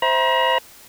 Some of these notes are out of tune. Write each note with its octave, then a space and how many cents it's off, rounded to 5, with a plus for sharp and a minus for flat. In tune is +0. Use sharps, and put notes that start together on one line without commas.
C5 +0 E5 -10 A#5 +40